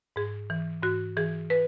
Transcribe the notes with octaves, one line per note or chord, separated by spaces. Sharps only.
G#2 G#4
E3
G#2 F#4
E3 G#4
B4